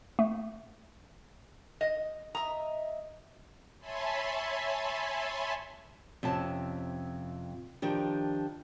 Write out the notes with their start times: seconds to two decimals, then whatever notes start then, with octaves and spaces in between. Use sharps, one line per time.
0.19 A3
1.81 D#5
2.35 D#5 E5 A#5
3.80 C#5 E5 G#5 A5 B5 C6
6.23 F2 C3 C#4 A5
7.82 D#3 F3 D4 G4